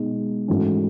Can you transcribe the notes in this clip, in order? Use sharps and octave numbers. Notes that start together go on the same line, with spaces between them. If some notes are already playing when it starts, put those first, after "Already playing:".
Already playing: B2 G#3 D#4
G#2 E3 A3 C#4 F#4